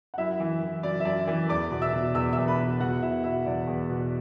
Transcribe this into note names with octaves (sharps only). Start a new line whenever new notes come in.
F#5
F#2 E4 E5
E3
E3
F#2 D5
E5
F#2 D5
E3
E2 D5 D6
B2
E5 E6
B2
E2 E6
E2 E5 E6
B4 B5
B2
E2 F#4 F#5
B2 E4 E5
B2 E4 E5
E2 D5
E2
B2